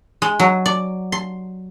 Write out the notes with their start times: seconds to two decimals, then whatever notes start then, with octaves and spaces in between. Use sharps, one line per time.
0.22 G#3
0.39 F#3
0.66 D5
1.12 C6